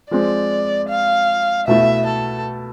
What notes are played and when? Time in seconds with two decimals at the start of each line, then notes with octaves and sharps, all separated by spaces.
0.11 F3 G#3 C4 D5
0.89 F5
1.67 B2 A3 E4 E5
2.06 A4